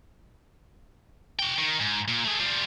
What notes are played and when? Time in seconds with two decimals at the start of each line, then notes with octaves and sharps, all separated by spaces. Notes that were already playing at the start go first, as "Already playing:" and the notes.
1.39 F#4 G5
1.58 D#3
1.80 G#2
2.08 A#2
2.25 A3 G#4
2.40 G3 F4